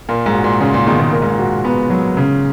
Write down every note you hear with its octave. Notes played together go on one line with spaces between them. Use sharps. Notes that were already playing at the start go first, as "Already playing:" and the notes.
A#2 A#4
G#2
F#4
A#2
A#2 C#3 C#4
A#2 C#3
B2 D#3 G#3
A#2 C#3
A#2 A#4
G#2
A#2
F#4
B3
F#3
C#3